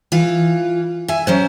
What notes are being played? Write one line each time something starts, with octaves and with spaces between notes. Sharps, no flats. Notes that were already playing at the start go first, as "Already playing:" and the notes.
E3 F4
E5 G#5
F#3 C#4 C5